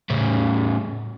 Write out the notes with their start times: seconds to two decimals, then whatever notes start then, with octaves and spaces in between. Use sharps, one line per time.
0.10 A2 C#3